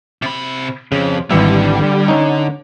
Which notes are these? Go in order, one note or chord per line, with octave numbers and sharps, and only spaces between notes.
C3 B5
F2 C#3
G#1 D3 E3 G3 E5
C#4 D#4